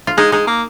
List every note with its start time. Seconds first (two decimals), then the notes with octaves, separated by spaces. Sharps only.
0.07 F4
0.17 G#3 D#4
0.32 G#3 D#4
0.47 A#3